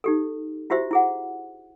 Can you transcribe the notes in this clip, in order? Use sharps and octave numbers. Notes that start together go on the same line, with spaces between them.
D#4 G4 A4
E4 F#4 G4 C5 E5
E4 G#4 F#5